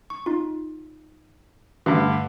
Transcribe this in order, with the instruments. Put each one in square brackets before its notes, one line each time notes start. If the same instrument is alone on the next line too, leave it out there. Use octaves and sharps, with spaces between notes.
[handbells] C#6
D#4 F4
[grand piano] G2 D3 [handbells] A3 F#4 B4